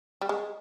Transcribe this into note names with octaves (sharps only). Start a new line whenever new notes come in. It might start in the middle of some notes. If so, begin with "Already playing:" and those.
G3
G#3